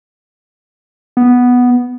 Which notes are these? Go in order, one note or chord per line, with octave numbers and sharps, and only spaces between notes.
B3